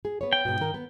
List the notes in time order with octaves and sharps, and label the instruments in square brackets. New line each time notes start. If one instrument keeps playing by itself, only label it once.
[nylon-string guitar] G#4
B3 C#5
[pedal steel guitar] G5
[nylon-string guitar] G#2 B2
G#2 D#3 A#4
B3